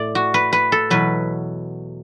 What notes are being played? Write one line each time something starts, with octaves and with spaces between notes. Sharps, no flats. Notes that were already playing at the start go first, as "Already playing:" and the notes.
Already playing: A2 A3 D5
F#4
B4
B4
A4
E2 B2 F#3 B4